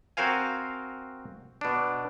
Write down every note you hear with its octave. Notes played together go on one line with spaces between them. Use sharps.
C4 F#4 A#4 C5 F5 G#5
B2 D4